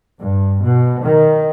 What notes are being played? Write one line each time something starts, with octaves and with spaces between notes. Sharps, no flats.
G2
B2
D#3